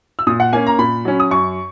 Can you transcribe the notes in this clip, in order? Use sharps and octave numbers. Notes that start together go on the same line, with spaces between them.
E6
A#2 D#6
F#5
A#3 C#4 G#5
A#5
A#2 B5
F#3 C#4
D#6
F#2 C#6